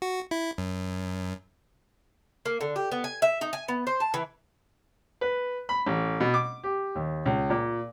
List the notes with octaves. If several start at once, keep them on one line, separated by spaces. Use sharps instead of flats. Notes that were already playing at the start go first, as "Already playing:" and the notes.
F#4
E4
F#2
A#3
D3
G4
B3
G#5
E5
D#4
G#5
B3
C5
A5
E3
B4
B5
A1
B2
D6
G4
D#2
C#2
A#2